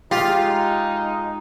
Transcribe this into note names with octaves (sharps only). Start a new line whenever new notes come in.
G#3 D#4 F4 G4